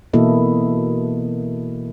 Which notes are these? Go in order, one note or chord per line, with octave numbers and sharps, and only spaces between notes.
B2 E3 A#3 E4 A4 D#5